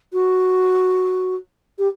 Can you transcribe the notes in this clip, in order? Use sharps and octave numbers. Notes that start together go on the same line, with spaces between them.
F#4
G4